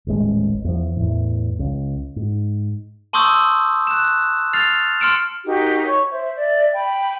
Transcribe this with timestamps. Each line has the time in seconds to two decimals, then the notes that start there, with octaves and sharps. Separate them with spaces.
0.07 D#1 A1 G#3
0.64 E2 F3
0.97 E2 A2
1.59 C#2
2.16 G#2
3.13 A5 C6 C#6 D#6 E6 G6
3.87 F#6 E7
4.53 F6 A6 C7 F7
5.00 C6 F6 C#7 D7 E7
5.45 D#4 F#4 G4 A#4
5.87 C#5 C#6
6.11 C5 E5
6.35 D5 E5
6.74 G5 B5